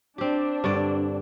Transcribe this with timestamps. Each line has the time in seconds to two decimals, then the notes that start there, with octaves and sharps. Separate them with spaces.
0.18 C4 D4 G4
0.64 G2 D3 D5